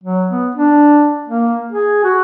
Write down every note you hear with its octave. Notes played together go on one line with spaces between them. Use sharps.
F#3
B3
D4
A#3
G#4
F#4